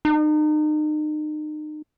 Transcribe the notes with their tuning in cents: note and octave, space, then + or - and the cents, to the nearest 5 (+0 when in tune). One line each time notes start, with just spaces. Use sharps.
D#4 -35